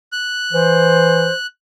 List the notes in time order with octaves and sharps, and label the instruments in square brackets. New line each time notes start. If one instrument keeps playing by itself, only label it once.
[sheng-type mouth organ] F#6
[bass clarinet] E3 [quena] C5